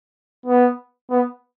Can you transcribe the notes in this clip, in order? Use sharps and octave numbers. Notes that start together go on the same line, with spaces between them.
B3
B3